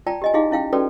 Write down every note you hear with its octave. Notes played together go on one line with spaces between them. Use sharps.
F4 D5 G5 A5 A#5
G4 D#5 G#5
D#4 E4 G4 G#4 D#5 F5
C#4 E4 F5 G5
C#4 F#4 A4 B4 D5 G5